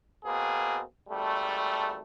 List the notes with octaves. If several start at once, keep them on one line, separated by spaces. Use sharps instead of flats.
B2 A#3 C4 G#4
G#1 G3 A3